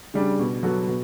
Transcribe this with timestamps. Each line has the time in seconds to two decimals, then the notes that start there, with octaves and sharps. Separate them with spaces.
0.14 C#3 G3 D4
0.39 B2
0.63 F#3 B3 F#4 A4
0.88 B2